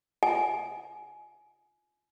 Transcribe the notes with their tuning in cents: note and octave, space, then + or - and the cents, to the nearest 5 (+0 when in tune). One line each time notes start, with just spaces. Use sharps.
G#5 +20